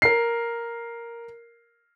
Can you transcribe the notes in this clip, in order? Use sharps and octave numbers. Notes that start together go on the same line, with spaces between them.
A#4 C7